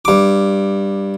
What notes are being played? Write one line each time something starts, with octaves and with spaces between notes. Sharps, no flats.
G2 D6